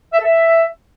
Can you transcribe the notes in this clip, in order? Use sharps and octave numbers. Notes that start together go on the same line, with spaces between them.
E5
A4
E5